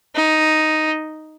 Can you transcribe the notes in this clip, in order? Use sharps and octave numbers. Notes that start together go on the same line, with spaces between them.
D#4